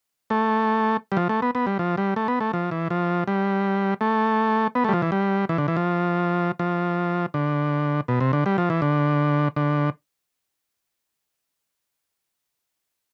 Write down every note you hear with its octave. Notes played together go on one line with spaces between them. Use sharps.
A3
G3
F3
A3
B3
B3
G3
F3
G3
A3
B3
A3
F3
E3
F3
G3
A3
B3
A3
G3
F3
E3
G3
E3
D3
E3
F3
F3
D3
B2
C3
D3
G3
F3
E3
D3
D3